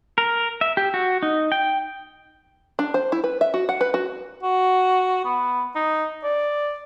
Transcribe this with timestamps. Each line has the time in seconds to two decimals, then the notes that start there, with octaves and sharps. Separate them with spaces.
0.18 A#4
0.61 E5
0.77 G4
0.94 F#4
1.23 D#4
1.52 G5
2.79 D4
2.94 C5
3.12 E4
3.24 B4
3.41 E5
3.54 F#4
3.69 F#5
3.81 B4
3.94 F#4
4.43 F#4
5.25 B3
5.75 D#4
6.23 D5